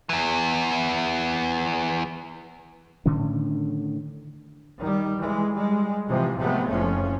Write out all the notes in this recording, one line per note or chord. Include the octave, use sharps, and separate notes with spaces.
E2 E3
A2 D3 D#3 C#4
D#3 G3
E3 G#3
G3 G#3
C3 E3 F3 G#3
C3 F3 F#3 G#3 A3 B3
F#1 F2 F3 C#4